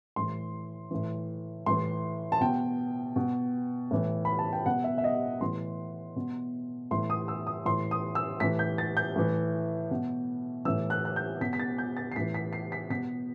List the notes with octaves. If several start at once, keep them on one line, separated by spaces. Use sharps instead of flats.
A2 E3 C6
A2 E3
A2 E3 C6
A5
B2 G5
B2
A2 E3
B5
A5
G5
B2 F#5
E5
E5
D#5
A2 E3 C6
B2
A2 E3 C6
D#6
E6
D#6
A2 E3 C6
D#6
E6
A2 E3 B6
G6
A6
G6
A2 E3
B2
A2 E3 E6
F#6
F#6
G6
B2 B6
B6
A6
G6
A6
C7
A2 E3 B6
B6
C7
B6
B2 B6